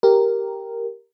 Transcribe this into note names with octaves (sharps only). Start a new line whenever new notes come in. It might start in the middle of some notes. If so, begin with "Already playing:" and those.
G4 A#4